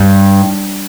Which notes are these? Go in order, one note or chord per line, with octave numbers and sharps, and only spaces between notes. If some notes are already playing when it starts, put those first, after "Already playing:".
Already playing: G2